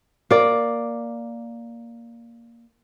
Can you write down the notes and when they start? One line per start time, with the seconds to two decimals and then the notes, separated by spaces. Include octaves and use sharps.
0.31 A#3 D5